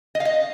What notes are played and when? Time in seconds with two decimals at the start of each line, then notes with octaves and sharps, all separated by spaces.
0.15 D#5
0.20 F5
0.25 D#5